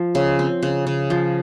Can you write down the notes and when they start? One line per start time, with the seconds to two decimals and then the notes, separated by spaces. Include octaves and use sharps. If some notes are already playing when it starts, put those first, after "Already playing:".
Already playing: F3
0.15 C#3
0.39 C4
0.63 C#3
0.87 C#3
1.10 F3